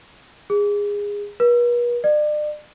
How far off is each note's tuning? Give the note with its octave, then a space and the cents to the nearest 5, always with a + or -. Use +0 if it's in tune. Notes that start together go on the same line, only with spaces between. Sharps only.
G#4 -20
B4 -45
D5 +40